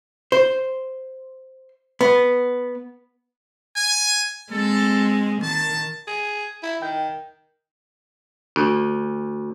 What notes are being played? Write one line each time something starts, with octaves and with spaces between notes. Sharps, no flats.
C5
B3
G#5
G#3 C4 A4
D#3 A5
G#4
E4
D#3 G5 G6
D2